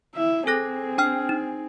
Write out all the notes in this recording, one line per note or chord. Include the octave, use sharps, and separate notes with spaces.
E4 E5
C4 G#4 A4 F#6 A#6
D4 G5 F6
D#4